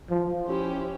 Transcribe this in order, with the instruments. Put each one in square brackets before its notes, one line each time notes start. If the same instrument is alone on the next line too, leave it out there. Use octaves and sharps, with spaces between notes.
[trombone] F3
[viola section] C#4 E4 G4 C5